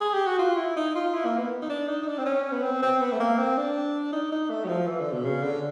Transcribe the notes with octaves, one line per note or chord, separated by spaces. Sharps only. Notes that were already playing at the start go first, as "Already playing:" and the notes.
G#4
G4
F#4
F4
E4
D#4
F4
E4
A#3
B3
D#4
D4
D#4
D#4
D4
C4
C#4
B3
C4
C4
B3
A3
A#3
C4
D4
D#4
D#4
A3
F#3
F3
E3
D3
B2
C#3
D3